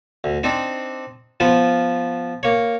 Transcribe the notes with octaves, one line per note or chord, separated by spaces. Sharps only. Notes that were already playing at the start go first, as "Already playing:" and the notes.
D2
C4 D4 D#4 C5
F3 B3 F4 C5
A#3 C#5